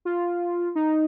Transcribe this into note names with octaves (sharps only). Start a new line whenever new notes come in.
F4
D#4